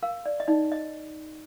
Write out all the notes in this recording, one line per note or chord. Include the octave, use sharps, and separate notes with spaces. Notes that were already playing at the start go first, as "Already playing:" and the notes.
A#4 F5
D5
D#5
D#4 D5
D#5